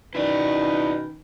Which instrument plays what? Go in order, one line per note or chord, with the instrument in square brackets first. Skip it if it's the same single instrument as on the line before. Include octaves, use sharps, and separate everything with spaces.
[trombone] B2 [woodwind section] D#3 C#4 D#4 [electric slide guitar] E4 D5 [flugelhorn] B4